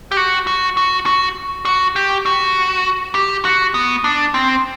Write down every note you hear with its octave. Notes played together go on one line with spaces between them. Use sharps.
G4
F#4
F#4
F#4
F#4
F#4
G4
F#4
G4
F#4
B3
D4
C4